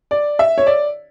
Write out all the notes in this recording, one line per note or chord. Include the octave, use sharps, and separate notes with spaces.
D5
E5
C#5
D5